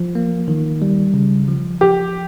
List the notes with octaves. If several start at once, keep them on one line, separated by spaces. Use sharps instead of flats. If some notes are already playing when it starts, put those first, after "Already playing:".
Already playing: F3
A#3
D#3
G3
C#3
F3
F3 G4